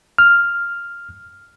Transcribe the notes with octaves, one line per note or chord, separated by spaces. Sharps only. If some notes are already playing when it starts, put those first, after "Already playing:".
F6